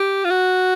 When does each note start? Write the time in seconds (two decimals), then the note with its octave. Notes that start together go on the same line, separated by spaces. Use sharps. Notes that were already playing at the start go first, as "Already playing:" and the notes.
Already playing: G4
0.24 F4
0.30 F#4